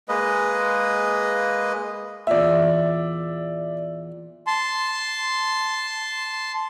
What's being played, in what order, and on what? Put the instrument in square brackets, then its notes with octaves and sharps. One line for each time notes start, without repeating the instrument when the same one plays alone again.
[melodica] G#3 A#3 B4 D#5
[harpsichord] E2 A#2 [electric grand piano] D5 E5
[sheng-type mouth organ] A5 C6